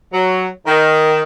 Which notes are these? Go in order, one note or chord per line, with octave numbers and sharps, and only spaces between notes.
F#3
D#3